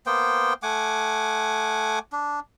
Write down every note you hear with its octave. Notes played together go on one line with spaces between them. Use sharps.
A#3 B3 C5 G5
A3 F#5 G#5 D6
D4